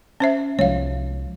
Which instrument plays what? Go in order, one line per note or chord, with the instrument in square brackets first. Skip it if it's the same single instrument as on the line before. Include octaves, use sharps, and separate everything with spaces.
[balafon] C#4 C5 E5
[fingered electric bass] C2 F3 G#3 [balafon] C#5 F5